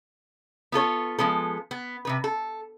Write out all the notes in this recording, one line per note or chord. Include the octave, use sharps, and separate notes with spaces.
B3 F4 A4 C#5
F3 G#3 B3 A4
B3
C3 D#3 B4
A4